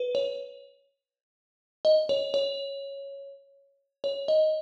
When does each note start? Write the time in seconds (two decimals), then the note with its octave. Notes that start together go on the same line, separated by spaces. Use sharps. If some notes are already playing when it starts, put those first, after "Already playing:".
Already playing: B4
0.15 C#5
1.85 D#5
2.09 C#5
2.34 C#5
4.04 C#5
4.28 D#5